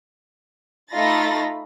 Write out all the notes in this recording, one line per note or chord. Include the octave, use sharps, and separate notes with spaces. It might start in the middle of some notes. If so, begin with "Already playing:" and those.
A3 D#4 F4 B5 A6 A#6